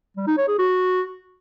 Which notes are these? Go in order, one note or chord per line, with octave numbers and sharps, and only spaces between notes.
G3
D#4
C#5
G#4
F#4